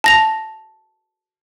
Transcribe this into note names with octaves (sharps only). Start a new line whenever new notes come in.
A5 A#6 F7